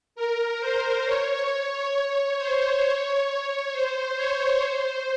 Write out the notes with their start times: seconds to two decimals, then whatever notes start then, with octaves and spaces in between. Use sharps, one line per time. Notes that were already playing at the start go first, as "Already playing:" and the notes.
0.16 A#4
0.60 C5
1.05 C#5
1.94 C#5
2.38 C5
2.83 C#5
3.26 C#5
3.72 C5
4.16 C#5
4.61 C5